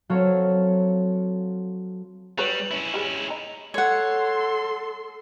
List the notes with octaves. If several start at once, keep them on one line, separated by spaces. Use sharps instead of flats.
F#3 C4 A4 C#5 F5
F#3 G3 B4 C#5 F7 F#7
C#4 E4
G3 G#3
D#4
A4 C#5 F#5 C6